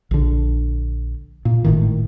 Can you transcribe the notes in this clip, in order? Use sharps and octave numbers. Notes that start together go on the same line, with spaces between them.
A#1 D3
A#2
G#1 A2 D#3